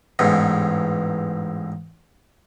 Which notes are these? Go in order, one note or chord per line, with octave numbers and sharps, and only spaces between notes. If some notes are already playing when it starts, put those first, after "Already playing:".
A1 E2 G#2